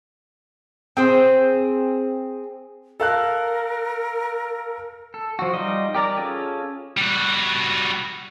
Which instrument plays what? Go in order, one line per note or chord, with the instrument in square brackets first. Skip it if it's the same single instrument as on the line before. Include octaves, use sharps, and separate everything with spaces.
[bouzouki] C4 G#4 C5
[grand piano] A4 F5 F#6 [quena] A#4
[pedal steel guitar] A4
F3 F#4
G3 D#4 F4 D#5
G4 A#4 D5 A#5
C#4 F4 G#4 A4
[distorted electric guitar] G3 F#4